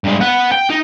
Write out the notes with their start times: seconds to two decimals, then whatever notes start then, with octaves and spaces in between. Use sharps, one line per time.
0.04 G2 G#3
0.20 B3 F#5
0.52 G5
0.70 D#4